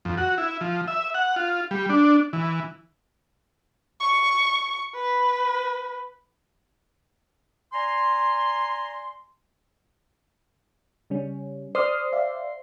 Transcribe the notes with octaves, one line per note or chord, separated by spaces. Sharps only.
F2
F#4
E4
F3
E5
F#5
F4
G3
D4
E3
C#6
B4
D5 G#5 A#5 C6
C#3 G3 C#4
C5 D5 D#6 F6
D5 E5 F5